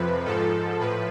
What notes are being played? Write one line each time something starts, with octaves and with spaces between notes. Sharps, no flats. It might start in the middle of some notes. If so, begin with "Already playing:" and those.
Already playing: F2 C3 F3 B4
G#2 F3 A4
A2 F3 B4